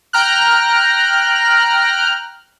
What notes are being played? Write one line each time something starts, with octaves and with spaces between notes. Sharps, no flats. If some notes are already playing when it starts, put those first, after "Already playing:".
G5 A#5 F6 F#6